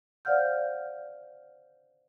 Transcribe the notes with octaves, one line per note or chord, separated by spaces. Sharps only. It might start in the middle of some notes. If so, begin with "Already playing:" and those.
C5 D5 F5 F#5 F6 G6